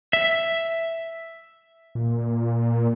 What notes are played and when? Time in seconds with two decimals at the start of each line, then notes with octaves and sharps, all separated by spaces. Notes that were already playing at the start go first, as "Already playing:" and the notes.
0.13 E5
1.95 A#2